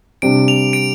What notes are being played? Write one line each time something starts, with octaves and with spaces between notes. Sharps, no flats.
C3 G3 D4 D7
F7
D7